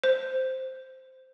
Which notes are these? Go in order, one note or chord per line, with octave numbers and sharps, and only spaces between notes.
C5